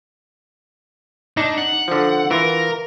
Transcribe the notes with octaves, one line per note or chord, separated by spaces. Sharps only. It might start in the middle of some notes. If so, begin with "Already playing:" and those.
D4 D#4
F#5
D3 F3
E3 F4 A#4